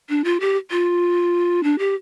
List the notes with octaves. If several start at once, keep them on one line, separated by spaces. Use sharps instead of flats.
D4
F4
G4
F4
D4
G4